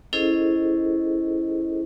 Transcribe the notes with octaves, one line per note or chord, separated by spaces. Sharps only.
C#4 E4 G#4 A4 C5 D#5